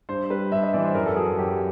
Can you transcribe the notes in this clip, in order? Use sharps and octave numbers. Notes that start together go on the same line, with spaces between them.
G2 C5
G3 B4
G2 E5
D#5
E3 D5
C5
F#2 A#4
A4
F#3 G#4
G#4
F#2 G4